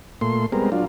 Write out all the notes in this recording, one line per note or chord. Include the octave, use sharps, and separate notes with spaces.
A#2 A3 C6
G3 G#3 B3 C4 A#4
F#3 D4 F4